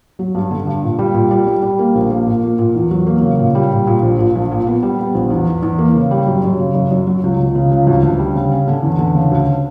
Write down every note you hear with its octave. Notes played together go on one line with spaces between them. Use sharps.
F#3
G2
D3
G2
A#2
G3
A#2
G3
G3
G3
A#3
A#1
A#3
A#2
A#3
A#2
E2
F#3
A#3
C#3
A#2
G3
A#2
A#2
A#1
A#2
A#1
A#2
B3
G3
B3
A#1
E2
E2
E2
A#3
C#3
G3
F#2
F#2
C#3
F#2
F#2
F#3
C#2
C#2
C#3
C#2
D2
D2
G3
C#3
C#4
D3
E2
D3
C#3
D2